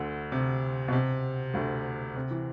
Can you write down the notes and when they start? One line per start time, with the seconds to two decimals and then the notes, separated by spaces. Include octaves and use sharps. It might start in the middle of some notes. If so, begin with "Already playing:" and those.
Already playing: D2 D3
0.32 C3
0.88 B2
0.92 C3
1.54 D2 D3
2.16 C3
2.31 E3